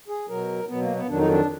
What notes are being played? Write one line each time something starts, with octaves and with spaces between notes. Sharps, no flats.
G#4
B2 F#3 A#4
B2 F#3 B3
A#3
B3
F2 D#3 F#3 D4
D#4
D4